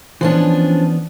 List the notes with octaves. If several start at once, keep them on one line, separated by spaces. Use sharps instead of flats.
E3 F3 B3 C#4 D4